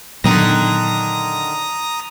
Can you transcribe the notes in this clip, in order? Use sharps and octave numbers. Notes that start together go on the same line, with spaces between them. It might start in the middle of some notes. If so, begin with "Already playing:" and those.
A#2 D3 D#3 F#3 B3 A#5 D#6 A#6